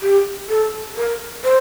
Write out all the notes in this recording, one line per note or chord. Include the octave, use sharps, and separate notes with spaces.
G4
A4
A#4
C5